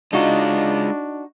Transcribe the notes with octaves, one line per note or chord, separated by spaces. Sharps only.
G#3 D4 D#4 F4 F#4